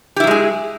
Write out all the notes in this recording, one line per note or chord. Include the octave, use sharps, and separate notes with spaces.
F#3 G#3 E4 G4 G#4